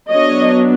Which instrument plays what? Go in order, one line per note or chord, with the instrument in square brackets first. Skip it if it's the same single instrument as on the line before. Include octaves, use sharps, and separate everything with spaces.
[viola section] F#3 B3 D4 C#5 D#5